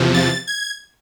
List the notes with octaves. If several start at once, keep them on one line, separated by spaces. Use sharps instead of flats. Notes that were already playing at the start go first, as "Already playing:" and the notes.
Already playing: E2 C3 F3
A6
G#6